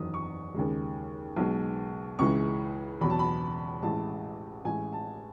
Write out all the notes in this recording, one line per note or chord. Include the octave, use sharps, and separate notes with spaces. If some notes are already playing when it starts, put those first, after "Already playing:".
Already playing: F#1 E2 D#3 F#3 D#6
C#6
D#2 C#3 G#3
B1 B2 G#3
C#2 C#3 E3 G#3 C#6
E2 B2 F#3 B5
A5
B5
A1 A2 G#3 A5
A1 A2 G#3 G#5
A5